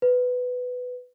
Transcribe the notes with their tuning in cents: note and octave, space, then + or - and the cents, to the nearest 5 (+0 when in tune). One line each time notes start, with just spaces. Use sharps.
B4 +10